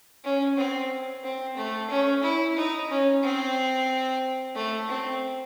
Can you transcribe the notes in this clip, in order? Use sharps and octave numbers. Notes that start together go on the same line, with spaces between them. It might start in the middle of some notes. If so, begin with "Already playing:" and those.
C#4
C4
C4
A3
C#4
E4
D#4
C#4
C4
A3
C4